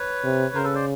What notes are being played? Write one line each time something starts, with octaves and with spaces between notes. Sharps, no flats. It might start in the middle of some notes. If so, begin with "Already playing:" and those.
Already playing: B4 C#5
C3
C#3 A#4 C5
A4 B4
C5 D5